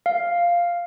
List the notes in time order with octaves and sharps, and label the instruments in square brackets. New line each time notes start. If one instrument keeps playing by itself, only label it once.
[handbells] F5